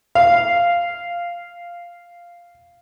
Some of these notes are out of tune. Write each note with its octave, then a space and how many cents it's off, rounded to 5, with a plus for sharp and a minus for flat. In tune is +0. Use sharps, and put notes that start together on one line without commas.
F5 -5